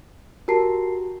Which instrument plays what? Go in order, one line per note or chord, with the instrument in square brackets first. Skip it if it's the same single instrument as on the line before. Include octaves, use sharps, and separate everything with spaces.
[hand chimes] F#4 G4 A#5 [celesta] A#4 A5 C7